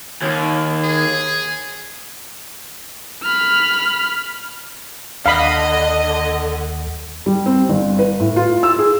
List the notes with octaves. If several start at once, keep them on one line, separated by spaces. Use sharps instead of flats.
D#2
G#4
B5 F6
D#2 D3 D#5 F5 B5
G3
C4
G1
B4
A2
F4
E6
G#4